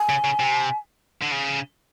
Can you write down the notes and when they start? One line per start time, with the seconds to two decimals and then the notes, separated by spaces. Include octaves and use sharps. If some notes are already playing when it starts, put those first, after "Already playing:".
Already playing: G#5
0.09 C#3
0.24 C#3
0.39 C3
1.22 D3
1.32 C#3